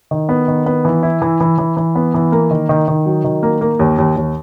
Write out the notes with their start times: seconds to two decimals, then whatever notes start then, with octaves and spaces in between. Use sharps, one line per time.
0.11 D#3
0.29 B3
0.48 D#3
0.66 B3
0.85 E3
1.03 E4
1.22 E3
1.40 E3
1.58 E3
1.77 E3
1.95 B3
2.14 E3
2.32 A#3
2.51 D#3
2.69 D#3
2.88 D#3
3.06 F#3
3.24 D#3
3.43 A#3
3.61 A#3
3.79 D#2
3.98 D#2
4.16 D#2